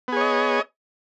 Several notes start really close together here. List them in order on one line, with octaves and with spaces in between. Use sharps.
B3 G#4 C#5 D#5